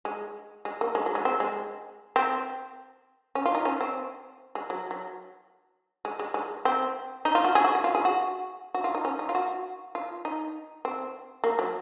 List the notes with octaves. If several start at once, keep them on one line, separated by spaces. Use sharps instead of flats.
G#3
G#3
A#3
G#3
F#3
G#3
C4
G#3
C4
C#4
F4
D#4
C#4
C4
G#3
F#3
F#3
G#3
G#3
G#3
C4
D#4
F4
F#4
G#4
F#4
F#4
F4
G#4
F#4
F#4
F4
D#4
C#4
D#4
F4
F#4
F4
D#4
C4
A#3
F#3